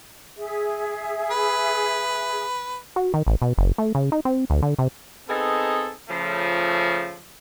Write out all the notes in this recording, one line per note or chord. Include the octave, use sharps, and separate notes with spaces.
G#4 E5
B4
F#4
D#3
A1
B2
F#1
A3
C#3
D#4
C4
D2
D3
C3
B3 C4 D#4 G#4 A4
C#3 F3 A3